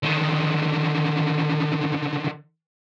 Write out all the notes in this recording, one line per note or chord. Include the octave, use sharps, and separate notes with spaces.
D3 D#3